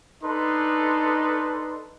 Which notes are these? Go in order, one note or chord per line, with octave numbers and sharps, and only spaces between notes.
D4 D#4 A4 B4 C6